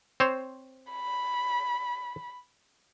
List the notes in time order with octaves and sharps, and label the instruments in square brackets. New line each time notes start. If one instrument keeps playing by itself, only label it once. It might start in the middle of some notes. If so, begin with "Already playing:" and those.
[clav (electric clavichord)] C4 C5 C#5
[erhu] B5